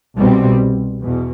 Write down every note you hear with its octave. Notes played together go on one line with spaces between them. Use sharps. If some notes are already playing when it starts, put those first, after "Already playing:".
C2 B2 G3 C4
E2 B2